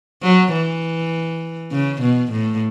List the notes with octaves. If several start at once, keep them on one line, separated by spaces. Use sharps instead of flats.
F#3
E3
C#3
B2
A2